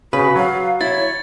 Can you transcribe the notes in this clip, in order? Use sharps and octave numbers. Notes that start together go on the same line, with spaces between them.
C#3 F#4 B4
F#3 F5
E4 C#5 A6